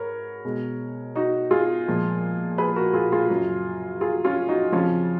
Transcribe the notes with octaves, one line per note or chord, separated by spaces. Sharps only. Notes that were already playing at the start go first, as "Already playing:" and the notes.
Already playing: G#2 G#3 A#4 B4 C#5
B2 G#3
D#4 F#4
F4 G#4
A#2 F3 G#3
G#4 B4
F#4 A#4
F4 G#4
F4 G#4
F#2 C#3 F#3
F4 G#4
C#4 F4
D#4 F#4
F2 C#3 F3 C#4 F4